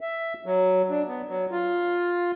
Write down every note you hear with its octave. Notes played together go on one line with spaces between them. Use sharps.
E5
F#3
D4
B3
F#3
F4